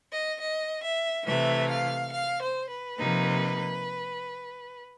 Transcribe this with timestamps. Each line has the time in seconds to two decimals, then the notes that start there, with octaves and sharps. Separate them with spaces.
0.11 D#5
0.40 D#5
0.84 E5
1.27 C3 E3 A3 E5
1.69 F5
2.13 F5
2.42 C5
2.70 B4
2.99 C3 F3 A#3 D#4